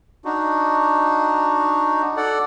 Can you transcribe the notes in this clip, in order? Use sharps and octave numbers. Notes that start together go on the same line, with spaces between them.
D4 D#4 F#4
A4 D5 F#5